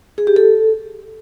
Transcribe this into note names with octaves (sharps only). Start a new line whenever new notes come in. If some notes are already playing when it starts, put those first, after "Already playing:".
G#4
G4
A4